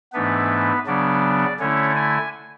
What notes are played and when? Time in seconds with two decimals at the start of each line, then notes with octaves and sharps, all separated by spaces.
0.13 G#2 E3 A3 B3 D4 B4
0.86 C#3 F#3 B3 D4 D5
1.59 D3 A3 C#4 E4 C#5
1.96 G#5